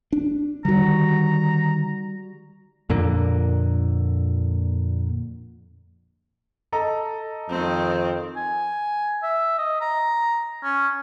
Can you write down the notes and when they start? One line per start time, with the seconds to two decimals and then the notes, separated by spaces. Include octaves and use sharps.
0.13 D4
0.65 D3 D#3 G3 F#4 A#5
2.90 F2 A#2 D3 A#3
6.72 A4 D#5 A#5
7.49 F2 D#3 C4
8.37 G#5
9.23 E5
9.58 D#5
9.81 A#5
10.63 C#4